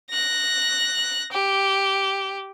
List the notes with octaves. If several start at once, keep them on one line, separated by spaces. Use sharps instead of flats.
F#6 A#6
G4